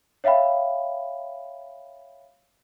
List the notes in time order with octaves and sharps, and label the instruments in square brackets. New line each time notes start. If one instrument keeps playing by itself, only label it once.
[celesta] C#5 E5 F5 G5 B5